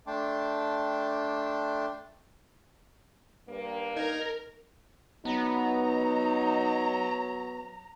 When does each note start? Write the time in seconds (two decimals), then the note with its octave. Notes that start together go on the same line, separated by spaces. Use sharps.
0.07 A3 D4 G5 A5 C6 D6
3.48 G2 A#3
3.96 D#4 A#4 G#6
5.25 F#3 B3 D#4 A#5